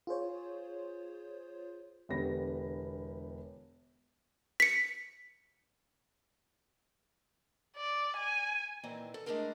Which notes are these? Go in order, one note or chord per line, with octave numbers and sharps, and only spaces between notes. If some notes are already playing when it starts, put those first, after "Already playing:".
F4 G#4 C5 C#5
E1 D3 B3 G4 B5 A#6
B6 C#7
D5
G#5
A#2 D#3 E3 C4 E4
A4
G#3 A3 D4 E4 G#4 A#4